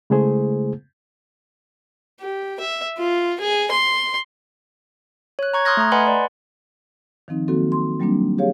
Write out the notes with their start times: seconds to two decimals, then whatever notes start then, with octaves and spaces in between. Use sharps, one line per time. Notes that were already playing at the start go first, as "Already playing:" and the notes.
0.10 C#3 G#3 A3 E4 G#4 C5
2.20 G4
2.60 E5
2.98 F4
3.40 G#4
3.72 C6
5.39 C#5 F#6
5.53 A#5 C#6 G#6
5.65 C6 D#6 F6 F#6 G#6 A#6
5.77 A3 A#5
5.92 B4 D#5 F#5 G#5 B5 C6
6.07 D5
7.28 D#3 F3 C4 D#4
7.48 D#3 F#3 A#3 C4 F#4 A4
7.72 C6
8.00 F#3 G3 A#3 C4 D4
8.38 G4 G#4 C#5 F5